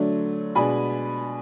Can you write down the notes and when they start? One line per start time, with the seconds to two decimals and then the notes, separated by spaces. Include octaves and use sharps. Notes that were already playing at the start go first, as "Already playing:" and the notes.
Already playing: D3 F#3 A3 D4
0.55 B2 G#3 D4 G#5 B5